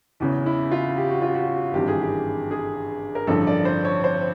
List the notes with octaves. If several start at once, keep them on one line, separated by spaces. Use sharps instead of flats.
E2 C#3 E3
E4
F4
G4
F#4
F4
F#4
G#1 G2 E3 G4
G#4
G4
G#4
A#4
A1 G2 D3 F3 A4
D5
C5
C#5
C5